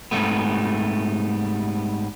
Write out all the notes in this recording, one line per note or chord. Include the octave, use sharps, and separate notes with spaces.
G#2 C3 F#3 G3 A3 B3